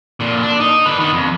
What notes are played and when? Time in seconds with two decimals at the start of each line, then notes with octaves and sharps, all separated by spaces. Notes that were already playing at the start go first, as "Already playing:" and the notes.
0.20 A#2 D3
0.43 D4
0.60 D#4
0.86 D3 B4
0.99 D#3 B3
1.13 F2